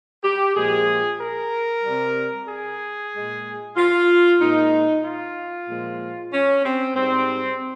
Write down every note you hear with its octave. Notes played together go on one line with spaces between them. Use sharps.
G4
A#2 F3 G#3 G#4
A#4
C3 G3
G#4
A#2 G#3
F4
A#2 G#3 D#4
F4
A#2 F3 G#3
C#4
C4
G#2 G3 C4